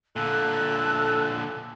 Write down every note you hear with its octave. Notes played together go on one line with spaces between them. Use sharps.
A#2 D3 A4 F#6